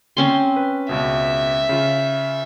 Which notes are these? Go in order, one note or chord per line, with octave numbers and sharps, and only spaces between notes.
C4 C#4 C6
B4
C#2 B2 E5
C#3 F4